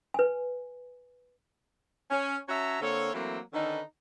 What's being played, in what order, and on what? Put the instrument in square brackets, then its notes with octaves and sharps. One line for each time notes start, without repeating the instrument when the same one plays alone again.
[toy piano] B4 G#5
[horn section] C#4
C#4 F#4 C#5 E5 A5 A#5
D3 A#3 C4 A4 C#5
E3 F#3 A3 A#3 C4
D3 D#3 C#4 D#4 A4 B4